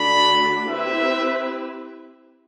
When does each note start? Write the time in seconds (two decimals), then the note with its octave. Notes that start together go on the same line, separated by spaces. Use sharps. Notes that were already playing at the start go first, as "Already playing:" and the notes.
Already playing: D3 A3 D4 F#4 B5
0.67 C4 E4 G4 B4 E5